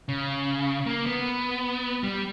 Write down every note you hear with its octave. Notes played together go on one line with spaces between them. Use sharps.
C#3
A#3
B3
G3